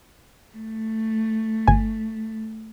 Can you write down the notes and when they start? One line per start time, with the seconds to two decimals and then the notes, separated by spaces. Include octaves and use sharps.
0.56 A3
1.68 G1 G#5